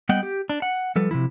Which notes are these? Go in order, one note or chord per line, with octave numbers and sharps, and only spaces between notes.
G3 B3 D#5 F#5 G5
G4
D4
F#5
F3 G3 A4 B4
C3 D#3 F3 E4